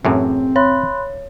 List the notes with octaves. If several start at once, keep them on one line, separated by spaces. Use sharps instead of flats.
F#2 A2 E3 C4 G#4
C#5 B5 C6 F#6